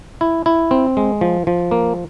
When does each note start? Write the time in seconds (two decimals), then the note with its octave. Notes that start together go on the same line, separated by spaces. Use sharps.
0.21 E4
0.46 E4
0.71 C4
0.97 G#3
1.21 F3
1.47 F3
1.71 A#3